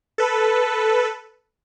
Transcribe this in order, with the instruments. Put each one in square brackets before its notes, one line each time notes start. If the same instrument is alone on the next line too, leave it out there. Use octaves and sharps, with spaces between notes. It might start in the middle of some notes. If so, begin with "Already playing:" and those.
[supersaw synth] A4 B4